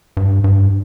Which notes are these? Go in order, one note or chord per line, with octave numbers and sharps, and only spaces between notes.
G2
G2